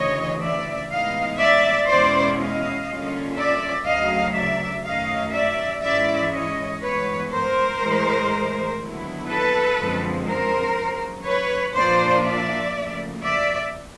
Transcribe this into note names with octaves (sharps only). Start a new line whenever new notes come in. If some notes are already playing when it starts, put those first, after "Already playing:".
Already playing: D2 C#3 E3 C#5 D#5
D5 E5
A2 E3 G#3 B3 D#4 D#5 F5
D5 E5
E2 B2 G#3 C#4 E4 C5 D5
D#5 F5
D3 G3 A#3 C#4 F4
D5 E5
D2 C#3 F#3 D#5 F5
D5 E5
F#2 D#3 F#3 A3 C#4 D#5 F5
D5 E5
G#2 E3 G#3 C#4 E4 D5 E5
C#5 D#5
G2 E3 G#3 B3 B4 C#5
A#4 C5
A2 E3 G#3
D#2 D3 F#3 B3 E4
A4 B4
F#2 D3 F3 G#3 C4
A#4 C5
D#2 C#3 F#3
B4 C#5
A#2 F3 A#3 D4 F4 C5 D5
D5 E5
D2 C#3 F3 A#3
D5 E5